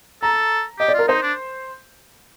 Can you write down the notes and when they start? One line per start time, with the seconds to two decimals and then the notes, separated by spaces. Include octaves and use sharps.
0.23 A4 A#5
0.79 G4 D#5
0.88 D5
0.94 F4 A#4
1.08 D#4 C5
1.23 D4